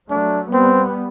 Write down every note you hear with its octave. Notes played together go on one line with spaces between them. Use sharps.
F#3 A3 D4
G3 B3 C4